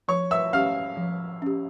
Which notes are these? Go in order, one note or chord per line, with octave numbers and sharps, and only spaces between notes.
F3 C#5 C#6
E5 E6
C#4 G4 F5 F6
F3
C#4 G4